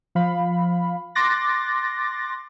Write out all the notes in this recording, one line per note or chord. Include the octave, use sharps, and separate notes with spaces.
F3 F5 B5
C6 D6 F#6 A6 A#6